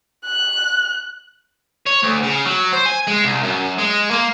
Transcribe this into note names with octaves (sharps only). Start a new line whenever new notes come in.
F#6
C#5
D2
C#3
F#3
C5
G#5
G#3
C2
F#2
G#3
A#3